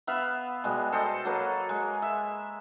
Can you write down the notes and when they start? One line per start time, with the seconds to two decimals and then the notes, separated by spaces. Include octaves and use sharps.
0.07 B3 E5 F5 B5
0.64 B2 G3 G#3
0.92 A4 C5 D#5
1.25 F#3 A#3 A4 B4
1.69 G#3
2.02 E5